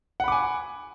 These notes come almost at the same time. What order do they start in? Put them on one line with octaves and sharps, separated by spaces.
F#5 B5 D6 G#5